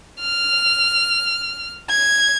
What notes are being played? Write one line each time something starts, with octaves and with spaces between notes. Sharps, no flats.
F6
G#6